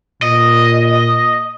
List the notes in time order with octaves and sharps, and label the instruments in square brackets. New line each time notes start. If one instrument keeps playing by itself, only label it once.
[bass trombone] A#2 [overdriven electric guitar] D#5